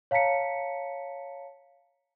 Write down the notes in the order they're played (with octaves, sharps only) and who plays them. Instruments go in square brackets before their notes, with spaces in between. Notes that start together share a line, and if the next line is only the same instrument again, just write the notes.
[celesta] C#5 F5 A5 A#5 B6 C#7